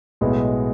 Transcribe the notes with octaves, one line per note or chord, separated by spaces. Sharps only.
B1 A2 G#3 B3 E4